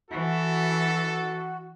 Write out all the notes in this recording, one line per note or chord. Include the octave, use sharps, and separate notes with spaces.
E3 F#4 A4